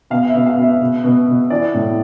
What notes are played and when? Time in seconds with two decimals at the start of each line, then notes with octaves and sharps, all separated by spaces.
0.10 B2 F5
0.29 E5
0.34 B2
0.46 F5
0.57 B2
0.62 E5
0.81 B2
1.04 B2
1.28 B2
1.50 E3 D5
1.74 A2